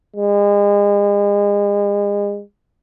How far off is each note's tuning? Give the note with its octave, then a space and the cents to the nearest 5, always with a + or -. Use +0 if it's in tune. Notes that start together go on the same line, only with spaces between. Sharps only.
G#3 -35